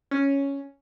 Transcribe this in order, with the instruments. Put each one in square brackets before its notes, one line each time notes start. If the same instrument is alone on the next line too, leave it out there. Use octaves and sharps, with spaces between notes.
[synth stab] C#4